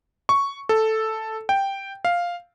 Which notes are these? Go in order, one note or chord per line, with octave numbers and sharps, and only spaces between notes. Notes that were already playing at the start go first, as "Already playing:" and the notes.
C#6
A4
G5
F5